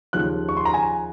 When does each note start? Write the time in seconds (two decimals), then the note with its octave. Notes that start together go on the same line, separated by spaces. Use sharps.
0.13 D#2 C#3 F3 F#6
0.49 C#6
0.57 C6
0.65 A#5
0.74 G#5